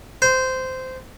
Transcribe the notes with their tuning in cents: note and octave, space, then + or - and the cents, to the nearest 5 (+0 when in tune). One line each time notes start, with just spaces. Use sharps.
C5 -15